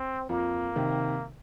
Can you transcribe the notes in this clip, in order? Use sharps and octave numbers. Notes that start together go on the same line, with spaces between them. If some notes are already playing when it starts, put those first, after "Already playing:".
Already playing: C4
F2 A#3
C3 D#3